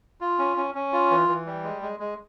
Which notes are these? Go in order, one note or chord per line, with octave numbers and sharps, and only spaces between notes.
F4
C#4
C#4
C#4
F4
E3
E3
G3
G#3
G#3
G#3